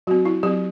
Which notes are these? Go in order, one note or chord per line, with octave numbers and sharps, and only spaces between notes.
F#3 C4 F#4
E4
F#3 C4 G4